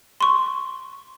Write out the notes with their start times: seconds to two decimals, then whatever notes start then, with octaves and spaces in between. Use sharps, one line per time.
0.21 C6 C#6